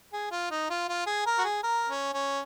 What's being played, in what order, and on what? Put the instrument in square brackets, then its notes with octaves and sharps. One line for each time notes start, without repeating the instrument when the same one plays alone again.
[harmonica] G#4
F4
D#4
F4
F4
G#4
A#4
F#4
G#4
A#4
C#4
C#4